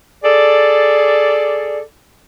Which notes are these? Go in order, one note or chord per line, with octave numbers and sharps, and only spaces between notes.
G#4 A4 D5